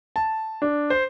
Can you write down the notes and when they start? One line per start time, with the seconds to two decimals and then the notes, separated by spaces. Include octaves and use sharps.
0.16 A5
0.62 D4
0.90 C5